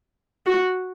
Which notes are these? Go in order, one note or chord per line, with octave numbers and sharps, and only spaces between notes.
F#4